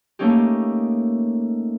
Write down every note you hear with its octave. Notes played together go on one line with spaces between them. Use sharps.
A3 A#3 C#4 D#4 G4